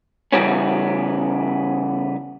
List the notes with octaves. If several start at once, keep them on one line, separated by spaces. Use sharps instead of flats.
C#3 E3 F3 G3 B3 C#4